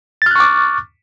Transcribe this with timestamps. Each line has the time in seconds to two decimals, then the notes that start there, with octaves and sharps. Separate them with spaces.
0.22 A6
0.26 F6
0.31 F#6
0.36 C#6
0.40 D6